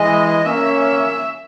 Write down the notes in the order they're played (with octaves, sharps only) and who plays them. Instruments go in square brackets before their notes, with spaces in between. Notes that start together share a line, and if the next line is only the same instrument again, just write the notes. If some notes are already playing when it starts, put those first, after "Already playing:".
Already playing: [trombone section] E3 G#3 [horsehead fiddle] D#5
[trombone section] A#3 C#4 [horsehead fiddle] E5